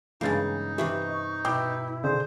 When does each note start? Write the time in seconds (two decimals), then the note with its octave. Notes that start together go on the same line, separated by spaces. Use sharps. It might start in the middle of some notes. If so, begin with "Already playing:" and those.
0.21 G2 C#3 E3 G#3 A#3 D#4 A6
0.78 C3 E3 E4 G4 C#6
1.09 D#5
1.45 B2 E4 G5 D6 G6
2.04 D3 G#4 C5